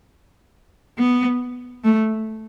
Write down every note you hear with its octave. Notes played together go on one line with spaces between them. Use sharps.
B3
A3